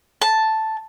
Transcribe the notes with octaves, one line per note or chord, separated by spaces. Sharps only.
A5